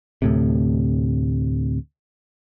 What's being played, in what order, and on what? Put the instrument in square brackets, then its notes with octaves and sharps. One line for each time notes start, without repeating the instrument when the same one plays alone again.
[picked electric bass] D2 A2 C3